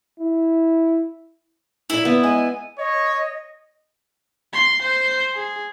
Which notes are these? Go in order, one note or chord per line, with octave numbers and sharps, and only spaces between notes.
E4
F2 A#2 E4 D5
B3
G#3 D#5 G#5
C#5 D#5
C6
C5
G#4